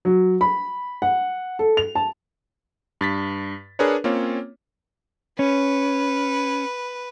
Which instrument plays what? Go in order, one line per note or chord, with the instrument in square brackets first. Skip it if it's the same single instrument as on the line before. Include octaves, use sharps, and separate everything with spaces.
[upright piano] F#3
B5
F#5
A4
F7
A5
[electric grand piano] G2 A6 B6
D4 G#4 A#4 B4 C#5
A#3 C4 C#4 F4 C#5
[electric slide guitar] C#4 [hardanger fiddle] B4